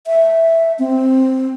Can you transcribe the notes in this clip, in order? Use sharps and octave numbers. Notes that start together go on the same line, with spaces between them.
E5
C4